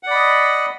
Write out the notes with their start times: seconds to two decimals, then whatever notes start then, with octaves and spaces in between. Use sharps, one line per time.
0.03 F#5
0.07 D5
0.11 B5
0.14 D#5